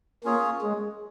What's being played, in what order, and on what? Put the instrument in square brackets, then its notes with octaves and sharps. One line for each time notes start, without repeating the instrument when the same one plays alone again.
[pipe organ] A#3 [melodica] C#4 F4 G#4 C#5
[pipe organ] G#3